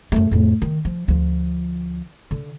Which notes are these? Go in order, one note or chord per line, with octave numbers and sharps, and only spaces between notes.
F#2 A3
F2 A2
D#3
F3
D2 F3
D3